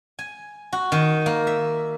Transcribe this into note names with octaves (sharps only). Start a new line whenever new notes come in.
G#5
F#4
D#3
A#3
E5